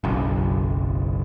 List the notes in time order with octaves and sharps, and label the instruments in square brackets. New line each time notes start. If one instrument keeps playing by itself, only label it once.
[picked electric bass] F#1 B1